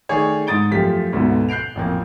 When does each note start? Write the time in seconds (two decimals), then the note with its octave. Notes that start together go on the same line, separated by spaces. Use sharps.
0.09 D#3 A3 G#4 C#5 D5
0.47 G#2 D#6 A6 D7 G7
0.71 F#2 F3 A3 G4 B6
1.13 D2 G#2 B2 D3 B3
1.49 F#6 G6 C7 D7 F7
1.75 A1 F2 A#3